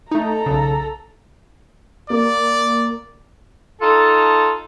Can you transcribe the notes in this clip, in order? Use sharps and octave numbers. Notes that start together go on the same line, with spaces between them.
A3 D#4 A4 A#5
B1 C#3
A#3 D5
D#4 F4 A4